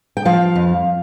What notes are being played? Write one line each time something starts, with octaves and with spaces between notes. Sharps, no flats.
G5
F3 F5
F2